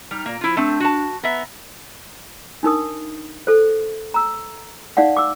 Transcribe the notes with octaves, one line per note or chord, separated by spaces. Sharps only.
G3 D#4 F6
A#2 A#3 D5 A#5
F3 E4 F4
A3 C4 D4
F#4 A5
B3 E5 A#5
D4 D#4 A#4 D#6
A4 C5
A#5 E6
D#4 D5 F5 F#5
D6 E6